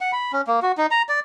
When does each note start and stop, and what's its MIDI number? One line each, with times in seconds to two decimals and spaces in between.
0.01 0.12 78
0.12 0.32 83
0.33 0.41 61
0.47 0.60 58
0.62 0.72 66
0.78 0.86 63
0.91 1.02 82
1.09 1.20 74